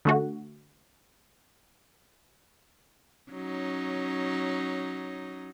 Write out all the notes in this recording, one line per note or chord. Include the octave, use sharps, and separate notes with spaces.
D3 A3 F#4
F#3 C#4 D#4